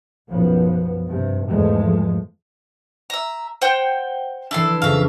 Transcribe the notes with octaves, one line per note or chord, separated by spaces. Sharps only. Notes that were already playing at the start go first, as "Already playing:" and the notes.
B1 F#2 F3 B3
G2 C3
E2 G#2 F3 G#3 A3
E5 A#5
C5 F#5 G5
E3 D4 E4 A4 C6
F2 C#3 E5 F5